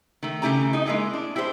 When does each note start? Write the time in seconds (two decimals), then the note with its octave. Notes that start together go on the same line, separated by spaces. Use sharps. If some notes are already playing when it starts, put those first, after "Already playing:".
0.23 D#3 A3
0.42 C#3 A3 E4 G4 G#5 A#5
0.73 D#4 D#5
0.85 G#3 A#3 E4 G#4 D#5
1.13 D4
1.36 E4 G4 G#4 C5